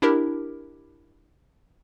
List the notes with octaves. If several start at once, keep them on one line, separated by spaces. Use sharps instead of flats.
D4 E4 G4 A#4